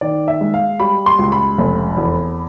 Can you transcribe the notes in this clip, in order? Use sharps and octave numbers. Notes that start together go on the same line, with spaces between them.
D#3 D5
E5
G#3
F5
G3 B5
C6
C#2
B5
F1
E2